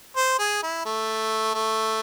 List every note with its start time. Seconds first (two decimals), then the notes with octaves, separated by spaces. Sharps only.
0.16 C5
0.39 G#4
0.63 E4
0.85 A3
1.54 A3